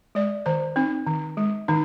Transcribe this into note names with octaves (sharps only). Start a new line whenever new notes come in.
G#3 D5
D#3 C5
C4 D#4
D#3
G#3
D#3 D#4